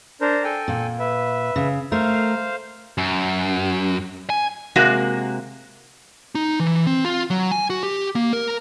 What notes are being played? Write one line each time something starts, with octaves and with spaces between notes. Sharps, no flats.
D4 A#4 C5
A4 G5 G#5
A#2
B4 E5
C#3
A3 A#4 C5 F5
F#2
G#5
C3 G#3 A#3 F#4
D#4
E3
C4
F4
F#3
G#5
F#4
G4
A#3
A#4